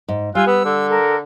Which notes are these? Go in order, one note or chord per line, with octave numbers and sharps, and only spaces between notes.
G#2
G3 F4 G#5 E6 F#6
B3 E6
D3
A4 A#4